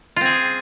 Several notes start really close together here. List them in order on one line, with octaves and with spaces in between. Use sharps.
F4 C4 G#4